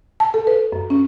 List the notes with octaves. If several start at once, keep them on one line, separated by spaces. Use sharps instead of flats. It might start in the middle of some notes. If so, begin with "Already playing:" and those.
A5
A4
B4
F#2
C#4